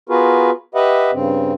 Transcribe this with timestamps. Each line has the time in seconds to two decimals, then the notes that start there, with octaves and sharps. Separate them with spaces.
0.09 B3 F4 F#4 G#4 A#4 B4
0.75 G4 B4 D#5 E5 F#5
1.13 G2 C#3 C4